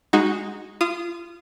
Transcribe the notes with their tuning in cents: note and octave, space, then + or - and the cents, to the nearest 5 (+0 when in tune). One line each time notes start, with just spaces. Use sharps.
G#3 -15 D#4 +0 F#4 +0
F4 -30 D#6 -10